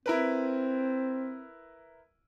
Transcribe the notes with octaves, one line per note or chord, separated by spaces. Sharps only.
C4 E4 A#4 B4